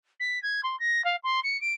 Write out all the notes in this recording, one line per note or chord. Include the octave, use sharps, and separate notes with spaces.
B6
G#6
C6
A#6
F5
C6
C#7
D7